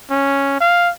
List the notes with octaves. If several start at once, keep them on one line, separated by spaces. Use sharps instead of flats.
C#4
F5